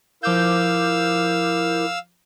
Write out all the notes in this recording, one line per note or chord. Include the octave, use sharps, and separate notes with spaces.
F3 E4 A#4 F5 D6 E6 G6